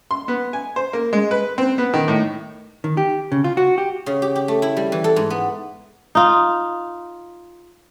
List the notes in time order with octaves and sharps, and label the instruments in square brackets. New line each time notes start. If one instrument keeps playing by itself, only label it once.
[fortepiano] C6
B3
G#5
C5
A#3
G#3
B4
C4
B3
D#3
A2
[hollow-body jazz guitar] D#3
G4
C#3
F4
F#4
G4
[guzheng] C#3
G4
G4
A3
E4
G3
E3
A4
G#2
B3
[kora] D#4 F4